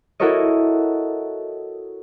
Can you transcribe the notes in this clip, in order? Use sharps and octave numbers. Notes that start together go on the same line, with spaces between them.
E4 F#4 A4 A#4 C#5 D#5